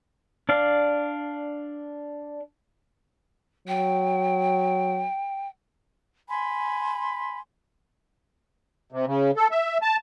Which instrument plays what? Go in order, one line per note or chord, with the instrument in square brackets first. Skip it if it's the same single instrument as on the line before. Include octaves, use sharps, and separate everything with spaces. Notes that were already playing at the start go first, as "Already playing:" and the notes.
[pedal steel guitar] D4 D5 F5
[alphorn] F#3 [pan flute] G5
[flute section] G#5 B5 C6
[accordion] C3
C#3
A4
E5
A5